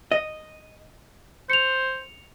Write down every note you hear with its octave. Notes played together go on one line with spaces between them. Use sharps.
D#5
C5 C#7 F7